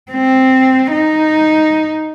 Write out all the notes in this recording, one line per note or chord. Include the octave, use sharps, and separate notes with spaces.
C4
D#4